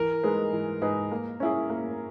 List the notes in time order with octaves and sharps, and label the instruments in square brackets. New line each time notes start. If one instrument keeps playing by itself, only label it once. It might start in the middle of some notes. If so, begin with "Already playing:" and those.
Already playing: [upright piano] E3 [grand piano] A#4
[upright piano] G#3 D#4 G#4 B4
E3
G#3 D#4 G#4 B4
A#3
C#4 E4 G#4
A#3